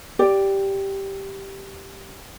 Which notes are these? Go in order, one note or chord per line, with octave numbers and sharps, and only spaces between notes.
G4 D5